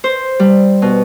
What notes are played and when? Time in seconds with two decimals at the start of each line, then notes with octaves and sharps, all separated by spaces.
0.04 C5
0.40 G3
0.82 B2